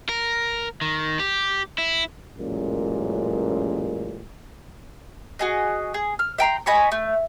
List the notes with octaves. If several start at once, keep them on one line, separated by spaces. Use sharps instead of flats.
A#4
D#3
G4
E4
A1 F#2 A#2 G#3
F#4 G#4 D#5
G#4
F6
E5 G5 A#5 C6
D#5 G#5 B5 C#6
A3